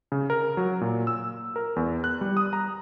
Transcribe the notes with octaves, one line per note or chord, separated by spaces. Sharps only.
C#3
A#4
F#3
A#2
E6
A#4
E2
F#6
G3
D#6
A#5